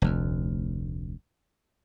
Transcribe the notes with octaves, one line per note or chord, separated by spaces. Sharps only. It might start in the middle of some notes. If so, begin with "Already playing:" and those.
F1 D2